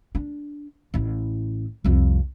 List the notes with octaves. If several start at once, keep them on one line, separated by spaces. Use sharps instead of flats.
D4
A1 E4
C2 F2